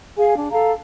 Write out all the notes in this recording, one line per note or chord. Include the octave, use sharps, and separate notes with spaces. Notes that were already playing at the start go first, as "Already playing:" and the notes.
G#4 F5 G#5
D4
A4 F5 A#5